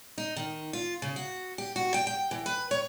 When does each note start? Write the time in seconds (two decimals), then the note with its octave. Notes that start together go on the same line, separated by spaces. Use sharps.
0.18 D#4
0.36 D#3
0.73 F4
1.02 C#3
1.16 F#4
1.58 G4
1.76 F#4
1.94 G5
2.07 G5
2.31 E3
2.46 B4
2.71 C#5